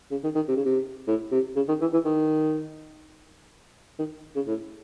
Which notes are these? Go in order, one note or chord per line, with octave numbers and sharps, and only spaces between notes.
C#3
D#3
D#3
C3
C#3
C3
A2
C3
C#3
D#3
E3
E3
D#3
D#3
C#3
A2